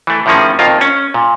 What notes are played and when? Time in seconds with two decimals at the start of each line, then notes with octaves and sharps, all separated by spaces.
0.07 E3 A3
0.26 A2 D#3 F3 A#3 C#4 G#4
0.59 F2 D#3 A#3 F4
0.81 C#4
1.14 A#2